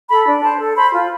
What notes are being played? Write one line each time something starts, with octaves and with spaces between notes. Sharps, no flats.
A4 B5
D4
C5 A5
A4
C5 B5
F4